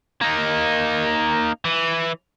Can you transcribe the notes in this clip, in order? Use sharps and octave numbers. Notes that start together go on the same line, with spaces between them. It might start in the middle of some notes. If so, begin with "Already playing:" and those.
A#3 D#4
E3